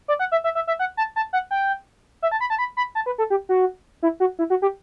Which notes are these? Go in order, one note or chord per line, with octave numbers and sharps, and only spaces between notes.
D5
F#5
E5
E5
E5
E5
F#5
A5
A5
F#5
G5
E5
A5
B5
A5
B5
B5
A5
B4
A4
G4
F#4
E4
F#4
E4
F#4
G4